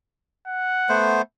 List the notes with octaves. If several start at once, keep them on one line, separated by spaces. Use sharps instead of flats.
F#5
A3 B3 C5